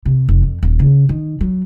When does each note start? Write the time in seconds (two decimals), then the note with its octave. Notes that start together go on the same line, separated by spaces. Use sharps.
0.05 C3
0.29 F1
0.43 F2
0.63 D#1
0.79 C#3
1.09 D#3
1.41 F#3